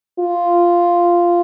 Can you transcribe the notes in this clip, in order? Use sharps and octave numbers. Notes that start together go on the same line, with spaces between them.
F4